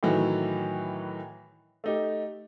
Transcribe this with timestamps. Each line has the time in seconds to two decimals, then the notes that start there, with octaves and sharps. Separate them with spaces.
0.03 A2 D#3 E3 F#3
1.84 A3 D#4 G4